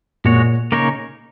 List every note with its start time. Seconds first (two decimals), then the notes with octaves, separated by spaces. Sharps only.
0.24 A#2 G#3 F#4 C#5
0.72 C#3 A#3 D#4 A#4 C#5